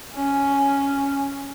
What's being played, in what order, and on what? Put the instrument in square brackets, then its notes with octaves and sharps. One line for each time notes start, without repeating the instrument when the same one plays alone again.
[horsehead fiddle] C#4